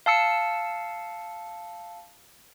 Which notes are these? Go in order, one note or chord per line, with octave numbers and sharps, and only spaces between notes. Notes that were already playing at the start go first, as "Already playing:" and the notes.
F5 A5 E6 C#7